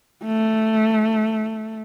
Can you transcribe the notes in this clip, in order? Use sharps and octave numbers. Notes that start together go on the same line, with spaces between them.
A3